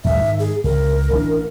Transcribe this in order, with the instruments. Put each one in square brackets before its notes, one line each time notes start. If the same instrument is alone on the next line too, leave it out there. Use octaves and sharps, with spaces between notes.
[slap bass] A#1 D#2 G#3 [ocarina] E5
[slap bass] G#2 D#3
[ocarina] G#4
[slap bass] C#2 [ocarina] A#4
[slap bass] A1 E3 D4